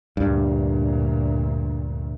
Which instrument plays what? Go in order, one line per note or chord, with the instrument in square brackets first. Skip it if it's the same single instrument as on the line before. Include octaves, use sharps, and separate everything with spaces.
[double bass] D2 A#2 [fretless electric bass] G2